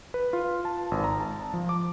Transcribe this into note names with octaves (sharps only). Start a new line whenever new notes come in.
B4
F4
A5
G#1
A#5
A5
F3
D6